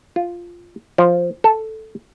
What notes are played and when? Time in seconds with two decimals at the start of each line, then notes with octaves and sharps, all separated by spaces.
0.16 F4
0.98 F3
1.44 A4